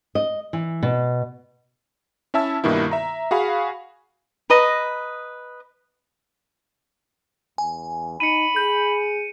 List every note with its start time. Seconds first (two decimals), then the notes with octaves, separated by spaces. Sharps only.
0.15 D#5
0.53 E3
0.83 B2
2.34 C#4 E4 E5 A5 E6
2.64 G2 B2 D#3 A#3 E4
2.91 E5 A#5
3.31 F#4 G#4 F5 B5
4.50 B4 D#5 A#5
7.58 E2 G#5
8.20 D#4 B5 C#7 D#7
8.56 G#4 G6